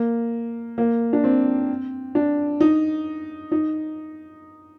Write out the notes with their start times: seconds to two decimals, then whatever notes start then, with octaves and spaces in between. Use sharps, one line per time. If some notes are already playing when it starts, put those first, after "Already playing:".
Already playing: A#3
0.78 A#3
1.13 D4
1.24 C4
2.15 D4
2.60 D#4
3.52 D#4